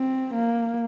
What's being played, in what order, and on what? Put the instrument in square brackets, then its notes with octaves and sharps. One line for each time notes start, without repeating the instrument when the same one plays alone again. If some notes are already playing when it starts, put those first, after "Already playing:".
Already playing: [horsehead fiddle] C4
A#3